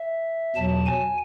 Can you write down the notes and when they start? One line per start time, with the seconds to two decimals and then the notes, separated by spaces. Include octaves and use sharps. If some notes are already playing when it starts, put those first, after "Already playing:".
Already playing: E5
0.56 E2 B2 F#3 A5
0.86 G#5